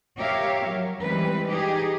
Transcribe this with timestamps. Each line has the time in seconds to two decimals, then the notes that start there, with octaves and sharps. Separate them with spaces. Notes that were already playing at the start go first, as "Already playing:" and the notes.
0.18 G4 A#4 C#5 E5 F5
0.66 F#3
1.00 E3 G3 G#3 C4 B4
1.47 D#4 G4 G#4